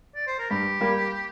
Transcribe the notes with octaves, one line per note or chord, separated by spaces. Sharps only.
D5
C5
A#4
G2 G4
G3 A#3